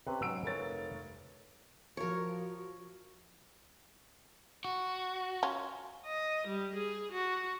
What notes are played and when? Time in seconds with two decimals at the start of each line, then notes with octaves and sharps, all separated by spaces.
0.07 C3 C4 C#4 B4
0.22 G#2 F#3 C#4 E6 D7
0.44 F1 A#4 B4 C#5 A6
1.97 F3 F#4 A#4 C#5
4.65 F#4
5.43 C#4 F4
6.06 D#5
6.47 G3
6.75 G#4
7.12 F#4